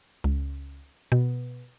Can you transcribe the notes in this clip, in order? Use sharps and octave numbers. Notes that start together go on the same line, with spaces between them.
C#2
B2